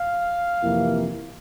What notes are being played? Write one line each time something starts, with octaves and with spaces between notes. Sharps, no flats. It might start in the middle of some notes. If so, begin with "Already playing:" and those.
Already playing: F5
F2 C3 E3 A#3 E4